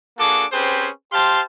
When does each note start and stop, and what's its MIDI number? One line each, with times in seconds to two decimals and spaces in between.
0.18 0.44 58
0.18 0.44 62
0.18 0.44 66
0.18 0.44 68
0.18 0.44 69
0.18 0.44 86
0.52 0.89 60
0.52 0.89 61
0.52 0.89 67
0.52 0.89 68
0.52 0.89 71
0.52 0.89 72
1.12 1.40 67
1.12 1.40 72
1.12 1.40 77
1.12 1.40 81
1.12 1.40 84